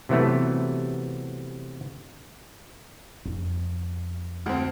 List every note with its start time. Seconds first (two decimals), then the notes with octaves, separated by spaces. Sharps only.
0.09 C3 E3 F#3 A3 B3
3.26 F2
4.46 D2 C4